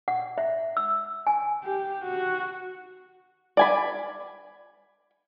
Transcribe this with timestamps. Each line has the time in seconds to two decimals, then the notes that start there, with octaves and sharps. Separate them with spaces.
0.08 F#5
0.38 E5
0.77 E6
1.27 G#5
1.64 G4
2.03 F#4
3.57 D5 G#5 B5